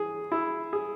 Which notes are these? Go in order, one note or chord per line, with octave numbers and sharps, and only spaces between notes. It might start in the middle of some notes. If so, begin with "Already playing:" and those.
Already playing: E3 G#4
E4
G#4